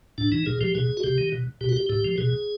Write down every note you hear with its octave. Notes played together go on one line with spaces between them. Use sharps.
A2 D4
E3 D#4
A#2 G#4
F3 G4
B2 G#4
F#4
C3 G4
D#3
B2
B2 G4
F#4
G4
A2 G4
F3
B2 G#4